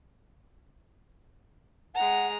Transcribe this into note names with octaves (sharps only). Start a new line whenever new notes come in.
G#3 F#5 A#5